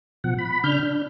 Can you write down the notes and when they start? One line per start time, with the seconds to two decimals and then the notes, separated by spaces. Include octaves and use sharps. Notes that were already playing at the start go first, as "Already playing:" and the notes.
0.24 B2 F3 F#5
0.39 B5
0.64 C#3 D4 F6 G6
0.83 D4